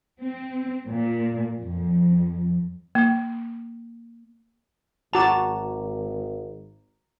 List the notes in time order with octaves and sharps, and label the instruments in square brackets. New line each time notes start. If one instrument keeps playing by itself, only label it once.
[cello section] C4
A#2
F2
[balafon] A#3
[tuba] G#1 [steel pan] F#4 A5 [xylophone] A#5 D6 A6